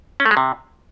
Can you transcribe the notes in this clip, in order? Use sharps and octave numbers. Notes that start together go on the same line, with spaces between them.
C#4
A3
G#3
C3